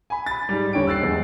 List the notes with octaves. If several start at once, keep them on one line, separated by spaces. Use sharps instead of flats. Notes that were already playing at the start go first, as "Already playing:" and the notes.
G#5 B5
B5 A6
G#2 G3
D#1 D3 C#5 G5 D7
E6 F#6 A6 C7
E2 G#3